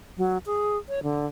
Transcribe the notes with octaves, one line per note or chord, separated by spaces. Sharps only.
F#3
G#4
C#5
D3